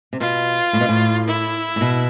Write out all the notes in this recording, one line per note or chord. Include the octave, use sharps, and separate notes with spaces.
C3
B2 F4
A2
B2
A2
E4
A2
B2